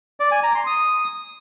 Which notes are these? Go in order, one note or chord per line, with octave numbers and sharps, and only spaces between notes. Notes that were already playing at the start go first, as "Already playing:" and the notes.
D5
G#5
A#5
C6
D#6